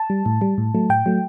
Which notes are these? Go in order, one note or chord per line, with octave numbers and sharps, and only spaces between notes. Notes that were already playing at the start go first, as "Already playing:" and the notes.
Already playing: A5
G3
A2
G3
A2
F#3 A3
A2 G5
F#3 A3